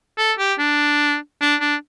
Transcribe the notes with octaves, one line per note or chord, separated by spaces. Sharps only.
A4
G4
D4
D4
D4